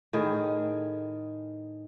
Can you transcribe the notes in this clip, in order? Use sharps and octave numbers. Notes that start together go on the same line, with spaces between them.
A2 D#3 G#4